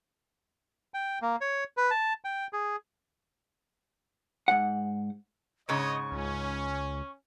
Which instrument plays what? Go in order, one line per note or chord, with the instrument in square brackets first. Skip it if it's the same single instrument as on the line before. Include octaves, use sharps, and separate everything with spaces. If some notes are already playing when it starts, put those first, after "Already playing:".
[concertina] G5
A#3
C#5
B4
A5
G5
G#4
[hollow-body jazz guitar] G#2 F#5
[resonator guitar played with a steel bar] G#2 C#3 [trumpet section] C#5 D#5 [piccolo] C#6
[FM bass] C#2 [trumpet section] C#4